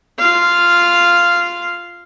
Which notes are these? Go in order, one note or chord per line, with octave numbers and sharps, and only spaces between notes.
F4 F5